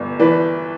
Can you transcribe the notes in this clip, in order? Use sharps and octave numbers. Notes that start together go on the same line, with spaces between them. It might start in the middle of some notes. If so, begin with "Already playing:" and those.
Already playing: G1 G2
E3 B4 D5